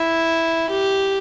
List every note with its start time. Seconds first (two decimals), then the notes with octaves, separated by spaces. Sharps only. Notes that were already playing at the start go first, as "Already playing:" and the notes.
Already playing: E4
0.70 G4